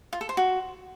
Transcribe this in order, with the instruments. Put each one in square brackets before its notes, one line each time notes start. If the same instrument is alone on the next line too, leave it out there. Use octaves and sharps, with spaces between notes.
[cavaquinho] F4
A4
C5
F#4